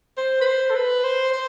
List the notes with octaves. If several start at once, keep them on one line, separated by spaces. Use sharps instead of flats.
C5
B4
C5
A4
B4
C5
C5